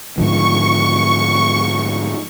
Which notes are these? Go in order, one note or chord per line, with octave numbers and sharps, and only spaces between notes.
G#2 D3 F3 C#6